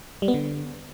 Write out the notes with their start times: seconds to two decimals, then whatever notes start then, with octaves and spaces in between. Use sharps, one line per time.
0.22 G3
0.28 B3
0.34 D3